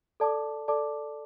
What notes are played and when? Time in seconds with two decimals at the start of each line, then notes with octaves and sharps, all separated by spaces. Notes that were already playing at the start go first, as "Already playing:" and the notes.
0.20 A4 D5 A5 D6
0.68 A4 D5 A5 D6